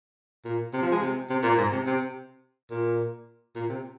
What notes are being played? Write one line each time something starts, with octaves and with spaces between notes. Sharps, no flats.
A#2
C3
F3
G#3
C3
C3
A#2
G#2
C3
C3
A#2
A#2
C3